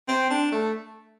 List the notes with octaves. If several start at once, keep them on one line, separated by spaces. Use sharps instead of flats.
C4
D4
A3